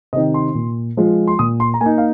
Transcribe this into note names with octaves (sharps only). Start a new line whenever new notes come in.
C3 D#3 C4 D#4 D#5
C6
A#2
F3 G#3 F4
C6
A#2 D#6
C6
A#5
A#3 D#4 G#5
F5